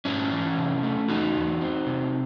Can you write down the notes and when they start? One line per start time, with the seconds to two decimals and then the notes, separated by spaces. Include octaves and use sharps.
0.05 G#2 C#4 E4
0.32 E3
0.57 C3
0.83 A3
1.09 E2 D#4 F#4
1.35 E2
1.61 C4
1.86 C3